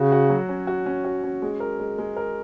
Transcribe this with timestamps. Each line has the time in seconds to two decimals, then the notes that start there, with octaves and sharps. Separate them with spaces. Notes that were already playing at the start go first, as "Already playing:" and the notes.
Already playing: C#3 F#4
0.12 F#4
0.30 F#3
0.49 C#4
0.67 F#4
0.86 C#4
1.05 F#4
1.24 C#4
1.42 G#3
1.60 A#4
1.80 G#3
1.98 G#3
2.17 A#4